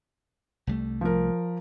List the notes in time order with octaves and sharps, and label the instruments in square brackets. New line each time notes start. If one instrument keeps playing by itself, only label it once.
[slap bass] C2 G3 A3
[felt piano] F3 A#4